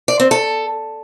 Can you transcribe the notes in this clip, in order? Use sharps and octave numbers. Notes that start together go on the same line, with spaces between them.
D5
C4
A4